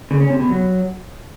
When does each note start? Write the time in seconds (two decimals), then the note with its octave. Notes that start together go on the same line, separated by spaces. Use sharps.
0.11 C#3
0.20 C#4
0.30 C3
0.40 B2
0.49 F#3